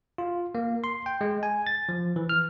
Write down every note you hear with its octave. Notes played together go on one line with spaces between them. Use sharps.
F4
A#3
C6
G5
G#3
G#5
A6
F3
E3
F6